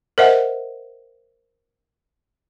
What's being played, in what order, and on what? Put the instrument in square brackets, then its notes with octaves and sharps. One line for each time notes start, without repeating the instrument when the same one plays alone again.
[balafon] A#4 C5 D#5 E5 F#5